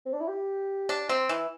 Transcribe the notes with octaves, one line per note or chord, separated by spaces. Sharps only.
C4
D4
E4
G4
D4
C4
E3